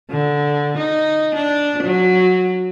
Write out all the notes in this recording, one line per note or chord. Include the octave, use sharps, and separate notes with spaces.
D3
D#4
D4
F#3